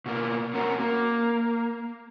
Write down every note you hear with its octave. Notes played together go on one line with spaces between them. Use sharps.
B2 A#3
C4 C#4 F#4 A#4
A#3